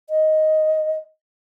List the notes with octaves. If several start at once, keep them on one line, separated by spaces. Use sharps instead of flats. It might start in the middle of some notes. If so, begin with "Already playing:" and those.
D#5